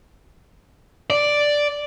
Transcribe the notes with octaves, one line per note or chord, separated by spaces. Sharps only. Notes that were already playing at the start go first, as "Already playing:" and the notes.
D5